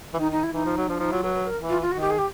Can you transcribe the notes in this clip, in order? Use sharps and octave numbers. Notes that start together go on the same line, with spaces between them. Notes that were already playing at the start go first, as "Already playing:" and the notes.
E3
D#3 D#4
D#4
E4
E3 D#4
F3
F#3
F3 D4
F3 D#4
F#3 F4
F#3 B4
B4
A#4
E3
F4
F4
D#3 F#4
G4
G#4
G4